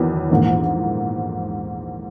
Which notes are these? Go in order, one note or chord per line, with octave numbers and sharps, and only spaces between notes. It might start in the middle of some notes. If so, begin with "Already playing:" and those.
Already playing: E2 D#3 F#3 B3
A#1 G#2 E3 A#3